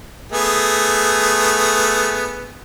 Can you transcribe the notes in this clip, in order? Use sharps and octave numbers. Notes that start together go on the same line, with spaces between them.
A3 B3 G#4